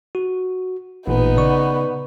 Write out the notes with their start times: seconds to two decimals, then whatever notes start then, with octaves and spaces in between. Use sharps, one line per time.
0.15 F#4
1.07 A1 A#2 B3 D#4
1.37 C#3 D5 C#6